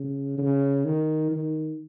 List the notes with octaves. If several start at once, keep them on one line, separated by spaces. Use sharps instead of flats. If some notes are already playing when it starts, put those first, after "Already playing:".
Already playing: C#3
C#3
D#3
D#3